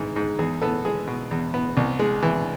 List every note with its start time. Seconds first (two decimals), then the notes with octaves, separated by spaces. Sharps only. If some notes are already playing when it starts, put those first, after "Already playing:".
Already playing: G#2 E3
0.16 G#2
0.39 E2 G#4
0.62 B3 A4
0.85 G#3 G#4
1.07 B2
1.31 E2
1.54 B3
1.77 C2
1.99 G#3
2.22 E3